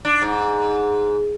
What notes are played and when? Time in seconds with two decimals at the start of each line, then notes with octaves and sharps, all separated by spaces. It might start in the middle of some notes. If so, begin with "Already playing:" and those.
0.05 D4
0.22 G#2